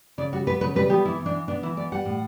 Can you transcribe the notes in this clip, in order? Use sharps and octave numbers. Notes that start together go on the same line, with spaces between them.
C#3 D5
G3 F#4
B3 B4
C#3 B4
G3 B4
B3 G4
E3 E4
E3
D4
B3
B3 D4
E3 E4
B3 D5
G3 F#5
A2